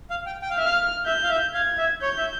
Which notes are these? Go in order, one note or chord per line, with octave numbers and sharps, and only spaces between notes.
F5
G5
G5
F5
E5 F6
F5
E5 G6
F5
E5
F5 G#6
E5
C#5 G6
E5